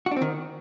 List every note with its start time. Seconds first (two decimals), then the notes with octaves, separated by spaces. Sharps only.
0.06 F#4
0.11 D4
0.17 C4
0.22 D#3